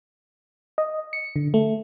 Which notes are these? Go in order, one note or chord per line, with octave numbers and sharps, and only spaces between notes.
D#5
C#7
D3
A3